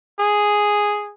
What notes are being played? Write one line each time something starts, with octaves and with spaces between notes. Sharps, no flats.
G#4